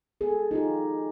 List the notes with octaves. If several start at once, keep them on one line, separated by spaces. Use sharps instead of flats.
B3 G#4 A4
D#4 F4 G4